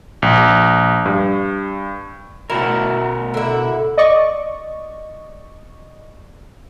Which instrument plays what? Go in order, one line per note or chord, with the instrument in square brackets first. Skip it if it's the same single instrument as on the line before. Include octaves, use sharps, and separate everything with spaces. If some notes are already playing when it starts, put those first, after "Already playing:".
[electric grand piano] A#1
G2
[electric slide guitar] B2 F#4 A#4 [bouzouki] E4
[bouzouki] D3 E4
[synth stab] D5 D#5 C#6